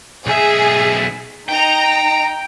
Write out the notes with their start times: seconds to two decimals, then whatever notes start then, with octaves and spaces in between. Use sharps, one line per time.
0.27 B1 G#4 E5
1.49 D#4 G5 A#5